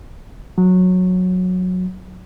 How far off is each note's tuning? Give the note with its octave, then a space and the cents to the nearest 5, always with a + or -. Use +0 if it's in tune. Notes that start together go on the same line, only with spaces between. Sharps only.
F#3 -15